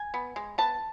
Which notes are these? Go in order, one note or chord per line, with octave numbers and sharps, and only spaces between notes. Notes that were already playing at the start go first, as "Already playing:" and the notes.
Already playing: G#5
B3
G#3
B3 A5